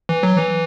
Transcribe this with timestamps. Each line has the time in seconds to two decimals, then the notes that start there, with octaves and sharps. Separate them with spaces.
0.09 E3
0.23 F#3
0.37 E3